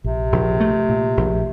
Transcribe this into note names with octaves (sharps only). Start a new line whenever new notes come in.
A#1 C3
A#1
A3
A#2
A#1